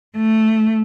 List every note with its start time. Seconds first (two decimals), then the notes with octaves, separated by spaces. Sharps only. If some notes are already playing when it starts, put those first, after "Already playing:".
0.17 A3